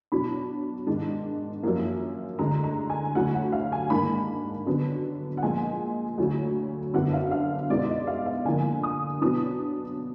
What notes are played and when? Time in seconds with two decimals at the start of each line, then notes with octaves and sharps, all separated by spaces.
0.12 B2 F#3 D4 B5
0.87 G#2 D#3 G#3 D4
1.63 F#2 F3 A#3
2.39 D2 D3 G#3 A#5
2.64 A#5
2.90 G#5
3.15 D2 D3 F#3 F#5
3.34 F#5
3.52 F5
3.72 G#5
3.90 G#2 D#3 A#3 D4 B5
4.66 D3 F#3 B3 D4
5.37 F#5
5.43 A#2 F3 G#3 G#5
6.18 D2 D3 F#3
6.94 F#2 D3 F#3 B3 D4 F#5
7.13 F5
7.31 F5
7.70 B2 G#3 B3 D#4 D5
7.88 D#5
8.07 F5
8.26 F5
8.45 D3 F3 A#3 G#5
8.83 D#6
9.21 B2 F#3 B3 D4 D#6